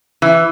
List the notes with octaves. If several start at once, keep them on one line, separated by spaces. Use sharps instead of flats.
E3